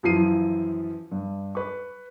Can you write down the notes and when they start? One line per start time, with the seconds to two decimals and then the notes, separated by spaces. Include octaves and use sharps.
0.03 F#2 E3 F3 F4 C7 D#7
1.11 G2
1.55 B4 C#6